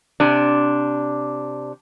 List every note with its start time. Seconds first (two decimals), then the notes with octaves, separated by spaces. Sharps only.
0.20 C3 D4